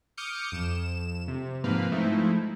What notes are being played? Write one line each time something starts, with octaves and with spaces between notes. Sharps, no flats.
D6 D#6 F6 G6 C#7
F2 E7
C3
G#2 F3 A#3 C4 B4 F5
F3 G#3 A3 C4 D#4 E4